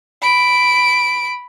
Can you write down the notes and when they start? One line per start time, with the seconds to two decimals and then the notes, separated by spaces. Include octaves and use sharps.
0.22 B5 D7